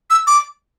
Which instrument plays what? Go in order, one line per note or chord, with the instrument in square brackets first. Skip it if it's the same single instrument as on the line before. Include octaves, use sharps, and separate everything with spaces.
[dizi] E6
D6